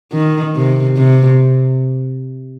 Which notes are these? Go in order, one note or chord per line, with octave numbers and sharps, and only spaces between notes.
D#3
C3
C3